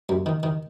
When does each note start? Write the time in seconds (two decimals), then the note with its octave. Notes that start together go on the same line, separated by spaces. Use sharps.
0.09 F#2
0.26 D#3
0.43 D#3